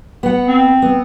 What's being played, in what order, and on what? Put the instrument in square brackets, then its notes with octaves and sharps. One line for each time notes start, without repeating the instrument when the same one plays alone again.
[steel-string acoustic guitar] B3 F#5
[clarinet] C4
[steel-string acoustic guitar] B3